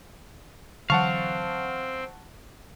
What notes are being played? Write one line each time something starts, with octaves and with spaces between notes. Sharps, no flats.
D3 E3 F#3 C4 F5 F#5 A5 C#6